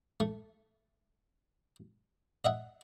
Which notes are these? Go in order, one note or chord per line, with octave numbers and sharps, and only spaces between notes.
A3
D#5 E5 F#5